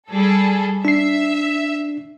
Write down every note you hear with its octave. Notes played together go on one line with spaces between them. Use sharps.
G3 G#4 A4
D4 E5 C7